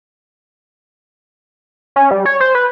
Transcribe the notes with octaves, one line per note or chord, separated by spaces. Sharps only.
C#4
G3
C#5
C5
B4